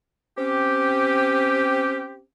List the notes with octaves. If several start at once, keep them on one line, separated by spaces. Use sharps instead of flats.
C4 C#4 G4